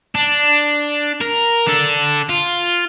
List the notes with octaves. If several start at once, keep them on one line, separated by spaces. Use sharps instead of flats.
D4
A#4
D4 A4
F4